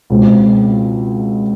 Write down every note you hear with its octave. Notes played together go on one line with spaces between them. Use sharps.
C#2 B2 G#3 C4